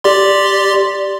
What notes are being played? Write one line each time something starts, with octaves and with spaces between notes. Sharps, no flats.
G4 D5 C6